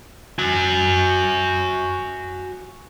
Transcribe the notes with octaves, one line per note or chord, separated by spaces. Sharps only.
F#4 G#5